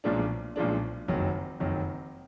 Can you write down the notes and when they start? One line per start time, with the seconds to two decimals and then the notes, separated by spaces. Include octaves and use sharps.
0.04 B1 A#2 F3 G#3 D4
0.56 B1 A#2 F3 G#3 D4
1.08 F#1 F2 D#3 F#3
1.60 F#1 F2 D#3 F#3